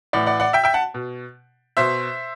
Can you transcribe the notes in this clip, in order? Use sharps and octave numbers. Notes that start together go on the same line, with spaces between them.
A2 E3 D5 F#5
D5 F#5
D5 F#5
E5 G5
E5 G5
F#5 A5
B2
B2 C5 E5